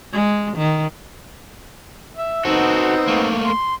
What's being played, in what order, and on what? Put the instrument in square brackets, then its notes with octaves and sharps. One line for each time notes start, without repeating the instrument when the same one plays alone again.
[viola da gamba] G#3
D#3
[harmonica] E5
[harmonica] B3 C4 [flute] D#4 [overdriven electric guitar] F#4 A4
[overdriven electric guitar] A3 A#3
[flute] C6